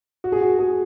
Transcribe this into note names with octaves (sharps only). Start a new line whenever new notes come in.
F#4
G#4
F#4
G#4